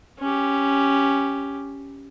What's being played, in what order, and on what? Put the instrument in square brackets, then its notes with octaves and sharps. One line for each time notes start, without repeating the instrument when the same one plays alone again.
[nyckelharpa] C#4 G4